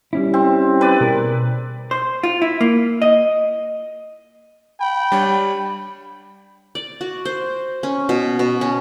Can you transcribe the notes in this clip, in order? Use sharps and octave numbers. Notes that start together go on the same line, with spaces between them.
G3 C#4 E4
C4
B4 D5
B2 G#4 A#4
C5
F4
E4
A#3
D#5
G5 B5
G3 D4 C#5
D5
F#4
C5
C#4
B2
B2
C#4